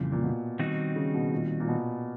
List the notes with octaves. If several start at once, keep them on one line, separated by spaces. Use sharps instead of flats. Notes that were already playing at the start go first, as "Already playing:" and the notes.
Already playing: F2 A#2 C#3 E3 G3 C4
A#2
B2
D#3 G3 C4 D#4 F#4
C#3
B2
A#2
A#2
B2